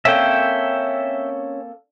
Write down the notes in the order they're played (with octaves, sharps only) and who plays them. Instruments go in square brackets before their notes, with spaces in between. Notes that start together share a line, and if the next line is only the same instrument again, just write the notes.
[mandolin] A#3 C4 A4 [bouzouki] C#4 [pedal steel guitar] E5 G5